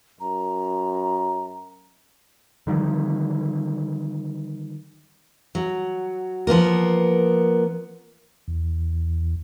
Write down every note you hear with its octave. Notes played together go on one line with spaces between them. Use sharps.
F#2 A#5
D3 D#3 F3 G3
F#3
F3 A#3 B3 A#4
E2